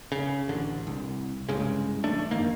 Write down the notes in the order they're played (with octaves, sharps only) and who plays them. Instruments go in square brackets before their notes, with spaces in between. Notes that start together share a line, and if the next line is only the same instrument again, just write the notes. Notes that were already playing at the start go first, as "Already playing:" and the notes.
[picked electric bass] C#3
A1 D3
C2
C2 G2 C#3 G#3
A1 A3 D4
F1 F#2 D#3 A#3